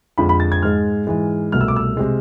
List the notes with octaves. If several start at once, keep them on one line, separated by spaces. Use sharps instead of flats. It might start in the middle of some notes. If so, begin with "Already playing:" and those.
F2 D3 F3 G#3 B5
B5
A6
G#6
G#2 G#3 F6
G#2 E3 G#3
C2 B2 A3 F6
E6
D6
E6
C3 G#3